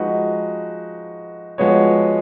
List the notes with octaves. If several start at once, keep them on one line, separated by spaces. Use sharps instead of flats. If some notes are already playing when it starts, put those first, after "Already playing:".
Already playing: F3 G#3 D#4 F#4 B4
F3 G#3 B3 F#4 C#5